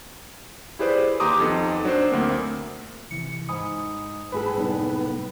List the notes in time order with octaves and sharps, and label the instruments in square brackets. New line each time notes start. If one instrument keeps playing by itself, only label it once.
[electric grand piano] E4 G4 G#4 B4 C5 D5
D#2 G4 A#5 C6 D6 D#6
F2 B3 D#4 A4
F#3 D4 C5
D2 A#3 C4
[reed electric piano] C3 E3 [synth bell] C#7
[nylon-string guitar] G#2 [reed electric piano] G#5 B5 D#6
[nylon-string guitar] A2 G#4 A4 [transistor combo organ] B4
[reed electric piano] F#2 C3 [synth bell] F#3 G3 D#4 [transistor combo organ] B3